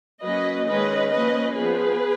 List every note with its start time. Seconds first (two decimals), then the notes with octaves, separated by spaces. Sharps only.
0.22 F#3 A#3 C#4 B4 D#5
0.66 D#3 G#3 C#4 B4 D#5
1.11 F3 A#3 C#4 B4 D#5
1.55 F3 B3 G#4 B4